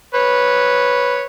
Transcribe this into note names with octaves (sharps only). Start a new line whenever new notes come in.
B4 C#5